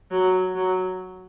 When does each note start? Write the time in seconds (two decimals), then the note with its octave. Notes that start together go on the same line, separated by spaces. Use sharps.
0.11 F#3
0.55 F#3